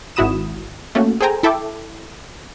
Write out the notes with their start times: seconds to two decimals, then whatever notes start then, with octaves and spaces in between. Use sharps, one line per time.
0.16 G#1 E4 F#4 B5 D#6 E7
0.95 A3 A#3 C#4 F#4
1.21 G#4 A4 C5 G5 G#5 A#5
1.43 E4 A4 E5 G5 D6